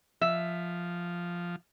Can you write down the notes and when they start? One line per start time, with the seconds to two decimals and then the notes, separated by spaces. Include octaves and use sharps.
0.21 F3 E5